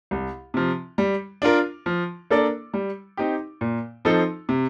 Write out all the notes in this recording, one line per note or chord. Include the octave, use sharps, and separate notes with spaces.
C2
C3 F3
G3
D4 F4 A#4
F3
A#3 D4 A4 D5
G3
C4 D#4 G4
A#2
F3 C4 D#4 A4
C3